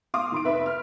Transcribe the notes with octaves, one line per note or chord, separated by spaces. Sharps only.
F5 C6 D6 D#6
D#3 C6 D7
F1 B4 E5
F6